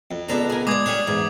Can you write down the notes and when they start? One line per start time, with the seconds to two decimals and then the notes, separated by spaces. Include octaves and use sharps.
0.11 F2
0.28 C#2 C3 B3 D4 A4 A#5
0.50 G#4 A#4
0.67 G#3 D5 D6 D#6 G#6
0.86 G3 D4 G#4 C#5
1.07 E2 G#2